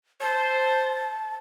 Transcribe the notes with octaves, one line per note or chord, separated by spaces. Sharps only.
C5 A5